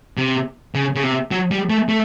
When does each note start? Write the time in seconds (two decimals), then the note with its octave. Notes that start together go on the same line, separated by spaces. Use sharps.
0.18 C3
0.75 C#3
0.96 C#3
1.03 C3
1.31 F#3
1.51 G3
1.70 A3
1.89 A3